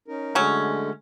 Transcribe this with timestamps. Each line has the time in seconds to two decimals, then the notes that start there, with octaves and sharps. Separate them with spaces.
0.08 C#4 D#4 A#4
0.35 D3 F#3 G#3 A3 C#4